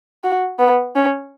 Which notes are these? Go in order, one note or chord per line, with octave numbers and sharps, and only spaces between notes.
F#4
B3
C#4